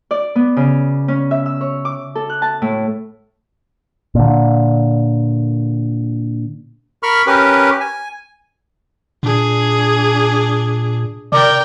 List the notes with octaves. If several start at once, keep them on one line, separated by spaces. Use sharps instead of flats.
D5
B3
C#3
C#4
E5
E6
C#5
D6
A4
F#6
A5
A2
A#2 D3
A#4 B5 C#6 F6
C#4 G4 A#4 B4
G#5
A#2 D4 G#4
C3 A#4 D5 G5